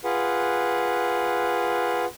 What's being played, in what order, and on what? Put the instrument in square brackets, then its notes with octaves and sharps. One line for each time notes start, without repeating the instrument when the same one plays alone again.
[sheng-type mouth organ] F4 G#4 B4 F#5